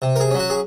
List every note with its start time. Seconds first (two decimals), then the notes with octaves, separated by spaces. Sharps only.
0.02 C3
0.16 A#4
0.20 G#4
0.31 F#3 C#4
0.39 F#4
0.50 G#4